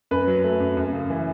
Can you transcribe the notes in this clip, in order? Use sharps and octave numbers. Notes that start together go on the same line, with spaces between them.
F#2 B4
F#3
A3
F#2
F#2
C#3
E3